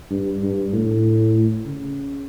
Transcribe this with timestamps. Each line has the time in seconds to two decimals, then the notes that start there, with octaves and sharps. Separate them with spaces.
0.11 G2
0.43 G2
0.73 A2
1.66 C#3